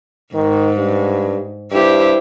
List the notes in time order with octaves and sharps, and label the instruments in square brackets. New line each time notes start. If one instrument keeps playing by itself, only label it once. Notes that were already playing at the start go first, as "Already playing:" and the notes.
[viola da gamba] G#2 [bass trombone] D#3
[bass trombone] G2
[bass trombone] G2 [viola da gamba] E4 G4 C5